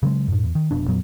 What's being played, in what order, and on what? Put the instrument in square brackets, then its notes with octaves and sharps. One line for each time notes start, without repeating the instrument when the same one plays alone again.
[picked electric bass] C#3 F#3 G#3
F#2 A2
E2
D#3
F1 F2 B2 D4
F2 A#2 F#3 B3